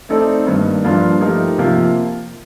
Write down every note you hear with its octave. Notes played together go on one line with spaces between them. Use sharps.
A3 C4 D#4 A4 D5
G2 D#3 A#3 D#4
G2 F3 A#3 D4 F4
F3 A3 D#4 G4 A#4
C3 F3 A#3 F4